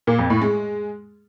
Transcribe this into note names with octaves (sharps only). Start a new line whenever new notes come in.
A#2
F2
A2
G#3